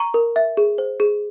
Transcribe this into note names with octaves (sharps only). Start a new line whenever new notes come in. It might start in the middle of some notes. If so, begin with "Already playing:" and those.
Already playing: A#5 C#6
A#4
E5
G#4
C5
G#4